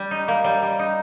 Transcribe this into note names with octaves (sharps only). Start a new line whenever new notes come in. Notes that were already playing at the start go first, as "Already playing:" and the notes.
Already playing: G3
D#4
A#3
G3
G3
D#4